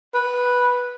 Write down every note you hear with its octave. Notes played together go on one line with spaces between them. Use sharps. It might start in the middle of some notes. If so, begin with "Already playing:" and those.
B4